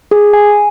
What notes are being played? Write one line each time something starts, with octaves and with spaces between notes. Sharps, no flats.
G#4
G#5